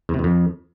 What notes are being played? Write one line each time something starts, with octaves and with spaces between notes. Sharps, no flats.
E2
C3
E2
F2